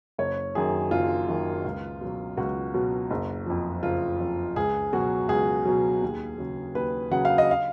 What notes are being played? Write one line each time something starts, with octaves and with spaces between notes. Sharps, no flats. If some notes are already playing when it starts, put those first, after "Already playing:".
F#1 C#5
F#2 D#3 F#3 G#4
F#1 F4
F#2 D#3 F#3
C#2
B2 F#3
C#2 F#4
B2 F#3
F#1
F2 F3
F#1 F4
F2 F3
C#2 G#4
B2 F#3 F#4
C#2 G#4
B2 F#3
D#2
C#3 F#3
D#2 B4
C#3 F#3 F#5
F5
D#5
F5